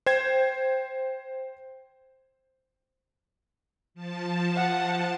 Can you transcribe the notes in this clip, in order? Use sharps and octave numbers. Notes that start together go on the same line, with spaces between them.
C5 G5 G#6
F3 A5
F#5